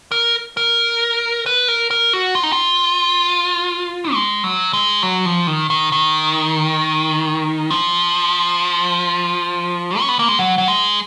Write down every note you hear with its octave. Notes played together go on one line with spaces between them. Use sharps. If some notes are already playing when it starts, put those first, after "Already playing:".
A#4
A#4
B4
A#4
A#4
F#4
F4
D#4
F4
G#3
F#3
G#3
F#3
F3
D#3
D#3
D#3
F3
C#4
B3
A#3
G#3
F#3
F#3
G#3